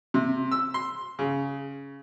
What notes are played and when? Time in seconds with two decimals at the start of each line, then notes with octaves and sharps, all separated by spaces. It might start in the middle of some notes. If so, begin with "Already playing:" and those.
0.14 C3
0.51 E6
0.74 C6
1.19 C#3